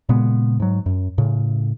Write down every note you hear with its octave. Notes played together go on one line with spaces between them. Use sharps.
A#2 C#3 G#3 B3
G#2 F#3
F#2
A2 C#3